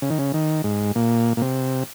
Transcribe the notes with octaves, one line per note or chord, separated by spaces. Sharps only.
C#3
D#3
C#3
D#3
G#2
A#2
A#2
C3